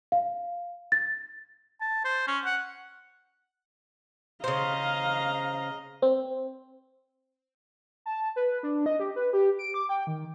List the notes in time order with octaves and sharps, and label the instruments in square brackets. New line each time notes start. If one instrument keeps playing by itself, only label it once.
[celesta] F5
A6
[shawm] A5
C5
C#4
F#5
[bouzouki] C#3 C5 [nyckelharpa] D#5 A#5 [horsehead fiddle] F5
[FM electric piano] C4
[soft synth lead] A5
B4
D4
D#5
G4
B4
G4
D7
D6
G5
D#3